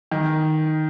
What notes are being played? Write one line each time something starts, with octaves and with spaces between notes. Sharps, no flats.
D#3